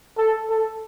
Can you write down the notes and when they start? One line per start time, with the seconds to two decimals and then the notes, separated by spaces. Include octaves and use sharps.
0.18 A4
0.50 A4